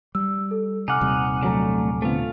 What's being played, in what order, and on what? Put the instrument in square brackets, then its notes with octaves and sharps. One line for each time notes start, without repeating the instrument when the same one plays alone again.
[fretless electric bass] G3 [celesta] E6
[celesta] A4
[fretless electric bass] C3 [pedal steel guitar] D#4 F#5 [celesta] G#5 D6 F6
[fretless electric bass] D#1 C3 G3
[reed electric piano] C2 F#3 A#5 [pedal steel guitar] D3 A3
[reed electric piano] D3 B3 C4 [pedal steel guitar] A3 F4